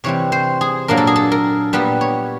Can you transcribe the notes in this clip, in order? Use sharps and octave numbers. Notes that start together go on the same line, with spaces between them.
C3 E3 G3 C4 C#5
C5
G#4
A#2 F#3 A#3 D4 A#4
A4
G#4
A4
A#4
A#2 G3 B3 B4
C#5